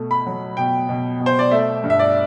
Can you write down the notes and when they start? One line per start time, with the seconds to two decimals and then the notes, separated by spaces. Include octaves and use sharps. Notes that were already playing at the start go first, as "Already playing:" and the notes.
Already playing: B2 A3
0.11 B5
0.27 F#3
0.57 B2 G5
0.89 B2
1.20 B2
1.26 C5
1.39 D5
1.51 A3 E5
1.84 G2
1.90 E5
1.99 D5